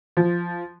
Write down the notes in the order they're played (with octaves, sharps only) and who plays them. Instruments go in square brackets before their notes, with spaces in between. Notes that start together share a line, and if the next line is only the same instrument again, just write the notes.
[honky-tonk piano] F3